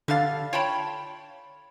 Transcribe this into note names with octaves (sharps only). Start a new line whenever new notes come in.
D3 G3 D4 F5 A6
F4 C#5 G5 A5 B5